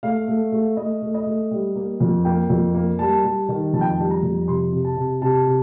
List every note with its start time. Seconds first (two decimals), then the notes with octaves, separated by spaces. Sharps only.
0.03 A3 F5
0.28 A3
0.52 A3
0.77 A3 D#5
1.02 A3
1.14 D#5
1.26 A3
1.51 G3
1.75 A#3
2.00 F2
2.25 A#3 G5
2.50 F2
2.74 A#3
2.99 G3 A5
3.24 G3
3.49 D#3
3.73 F2 A5
3.81 G5
3.88 A5
3.98 G3
4.11 A#5
4.23 F2
4.47 C3 C6
4.73 C3
4.85 A5
4.97 C3
5.22 C3 A5
5.46 C3